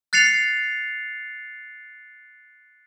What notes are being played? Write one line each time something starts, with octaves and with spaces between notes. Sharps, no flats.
F#6 A6 C7 C#7 F7